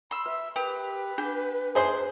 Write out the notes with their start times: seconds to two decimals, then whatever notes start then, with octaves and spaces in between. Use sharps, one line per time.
0.11 B5 C6 E6
0.26 B4 E5
0.56 G4 A#4 B4
1.18 D4 G#4 F#5 G6
1.75 G#4 C5 G#5 C6